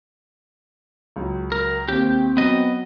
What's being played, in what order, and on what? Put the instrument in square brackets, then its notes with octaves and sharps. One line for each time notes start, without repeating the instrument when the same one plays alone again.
[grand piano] C#2 F#3
[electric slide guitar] A#4
[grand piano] D#2 [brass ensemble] C4 [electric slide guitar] G4
[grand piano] F#3 [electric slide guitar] B3 D#5